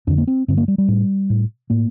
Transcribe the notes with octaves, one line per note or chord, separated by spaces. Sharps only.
F2 D3 D4
A#3
C4
G2 D3 C4
A#3
G3
G3
A2
A2
A2 A#3